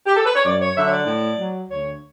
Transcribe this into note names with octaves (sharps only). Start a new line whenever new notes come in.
G4
A4
B4
C#5
F#2 D5
C#5
D3 F#3 E5
C#5
D5
A2
F#3
D2 C#5